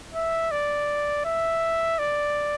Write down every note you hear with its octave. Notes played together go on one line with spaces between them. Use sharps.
E5
D5
E5
D5